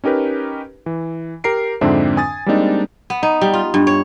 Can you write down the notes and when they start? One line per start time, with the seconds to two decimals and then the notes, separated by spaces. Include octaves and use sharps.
0.04 C#4 D#4 G4 A#4 B4
0.86 E3
1.44 G4 A#4 A#5 C7 D7
1.81 F2 G#2 D3 C4 D4 E5
2.17 G#5 D#6 A6
2.46 G3 G#3 A#3 C4 D4 D#4
3.10 B3
3.23 D#4
3.41 G3
3.54 F4
3.74 G2
3.87 C#5